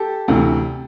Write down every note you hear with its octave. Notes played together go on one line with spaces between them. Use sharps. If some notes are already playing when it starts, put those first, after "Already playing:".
Already playing: G4 A4
D2 C3 E3